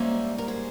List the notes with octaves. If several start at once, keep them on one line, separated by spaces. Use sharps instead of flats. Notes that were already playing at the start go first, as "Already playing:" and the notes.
Already playing: G#2 G3 A#3 C#4 C5 E5
A#4
G#4 C5